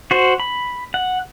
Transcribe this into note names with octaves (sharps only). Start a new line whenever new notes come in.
F#4 C5
B5
F#5